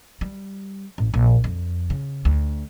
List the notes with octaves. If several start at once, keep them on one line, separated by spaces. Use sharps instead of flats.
G3
A1
A#1
F2
C#3
D2